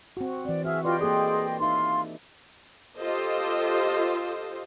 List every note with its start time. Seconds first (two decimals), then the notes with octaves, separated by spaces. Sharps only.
0.17 C4 F#4
0.45 E3 C4 D5
0.65 F#4 G#4 E5 F6
0.85 F4 G4 B4 D5 D#5 G5 C6
1.00 A#3 G#4 A4 D5
1.60 D#4 F4 E5 F5 C6
2.99 F4 G4 A4 C5 D#5